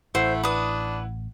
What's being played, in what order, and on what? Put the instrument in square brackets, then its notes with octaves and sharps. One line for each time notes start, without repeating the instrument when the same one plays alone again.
[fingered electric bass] A1 [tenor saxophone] A3 [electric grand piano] E4 F#5 [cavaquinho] C5
[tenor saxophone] D4 [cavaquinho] B4 D#6